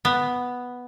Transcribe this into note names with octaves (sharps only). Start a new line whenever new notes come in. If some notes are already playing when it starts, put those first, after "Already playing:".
B3